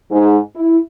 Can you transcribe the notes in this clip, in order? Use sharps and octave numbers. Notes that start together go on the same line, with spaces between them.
G#2
E4